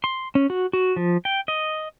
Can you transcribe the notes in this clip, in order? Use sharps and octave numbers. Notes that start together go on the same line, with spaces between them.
C6
C#4
F#4
F#4
F3
G5
D#5